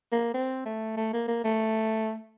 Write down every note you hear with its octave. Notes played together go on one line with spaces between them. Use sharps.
A#3
C4
A3
A3
A#3
A#3
A3